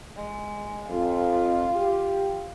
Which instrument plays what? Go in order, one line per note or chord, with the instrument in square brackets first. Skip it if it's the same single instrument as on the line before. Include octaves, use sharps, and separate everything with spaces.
[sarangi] G#3
[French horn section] F2 [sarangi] F4
[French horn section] G4